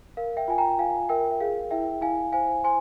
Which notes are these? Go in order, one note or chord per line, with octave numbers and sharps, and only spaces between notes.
A#4 F5
E5 G5
F4 G#5
G5 A#5
G5
F4 F5 G#5
A#4 E5 G5
E5
G#4 F5
E4 E5 G5
E4 F5 G#5
C5 F5 G#5
C5 G#5 C6